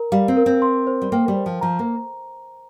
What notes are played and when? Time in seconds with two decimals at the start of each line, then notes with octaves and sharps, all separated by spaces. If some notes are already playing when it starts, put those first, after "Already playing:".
Already playing: A#4 A#5
0.12 G3 F5
0.28 C4
0.37 A#4
0.46 C4
0.62 C6
0.87 C5
1.02 G3
1.12 A#3 G5
1.28 G3
1.37 C5
1.46 F3
1.61 F3 A#5
1.79 A#3